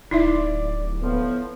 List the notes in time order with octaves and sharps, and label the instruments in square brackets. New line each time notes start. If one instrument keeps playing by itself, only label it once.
[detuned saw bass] D1 [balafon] D#4 E4 E5 [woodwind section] D5
[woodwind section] A2 F3 [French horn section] B3